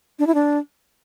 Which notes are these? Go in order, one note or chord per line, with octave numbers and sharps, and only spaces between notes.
D4
E4
D4